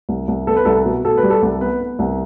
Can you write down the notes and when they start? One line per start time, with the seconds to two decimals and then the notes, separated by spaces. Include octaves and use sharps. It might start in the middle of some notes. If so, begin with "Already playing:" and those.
0.09 C2
0.28 C2
0.47 B3 A4
0.57 B4
0.65 C2 A4
0.85 B2
1.04 B2 A4
1.17 B4
1.23 G3
1.30 A4
1.42 C2
1.61 B3 B4
1.80 B3
1.99 C2